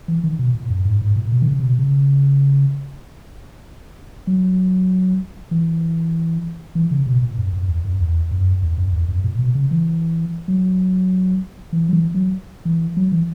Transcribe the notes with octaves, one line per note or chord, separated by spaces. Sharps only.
E3
D#3
B2
A#2
F#2
G#2
G#2
A#2
B2
D#3
C#3
C#3
B2
C#3
F#3
E3
E3
C#3
B2
A#2
F#2
F#2
E2
F#2
E2
F#2
E2
F#2
E2
F#2
A#2
B2
C#3
E3
F#3
E3
F#3
E3
F#3
E3
F#3
E3